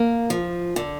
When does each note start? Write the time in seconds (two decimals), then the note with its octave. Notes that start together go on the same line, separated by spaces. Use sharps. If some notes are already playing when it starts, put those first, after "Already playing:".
Already playing: A#3
0.30 F3
0.76 D3